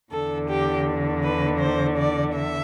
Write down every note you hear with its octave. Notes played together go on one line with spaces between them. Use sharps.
E2 D3 A4
G4
B4
C5
D5
E5